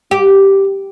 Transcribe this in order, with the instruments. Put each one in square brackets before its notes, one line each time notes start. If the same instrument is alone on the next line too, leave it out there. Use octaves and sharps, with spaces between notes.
[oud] G4